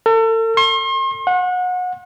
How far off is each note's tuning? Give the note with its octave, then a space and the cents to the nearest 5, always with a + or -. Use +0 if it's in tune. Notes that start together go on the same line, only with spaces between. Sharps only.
A4 +40
C6 +40
F#5 -30